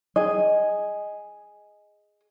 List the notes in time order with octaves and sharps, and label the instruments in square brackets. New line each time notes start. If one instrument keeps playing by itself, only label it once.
[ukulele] G#4 D#5